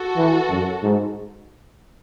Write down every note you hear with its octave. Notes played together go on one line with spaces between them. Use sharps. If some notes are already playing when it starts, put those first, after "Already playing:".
Already playing: F#4 A4
E3
F#2
G#2